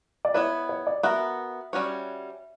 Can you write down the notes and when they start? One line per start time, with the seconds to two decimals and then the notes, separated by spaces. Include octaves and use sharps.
0.25 D5
0.34 B3 E4 B4 C#5
0.69 C#5
0.87 D5
1.03 B3 F#4 A#4 E5
1.73 G3 C#4 F#4 C#5